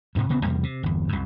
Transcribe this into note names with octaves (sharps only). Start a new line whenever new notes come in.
D2 G#2 C3
D#1 C#3 B3 C4
E2 C3 G3 A#3
C3
G1 E2
C2 F#2